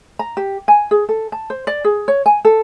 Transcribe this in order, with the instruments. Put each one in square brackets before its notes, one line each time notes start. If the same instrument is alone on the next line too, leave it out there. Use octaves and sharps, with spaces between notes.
[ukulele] A#5
G4
G#5
G#4
A4
A5
C5
D5
G#4
C#5
G#5
A4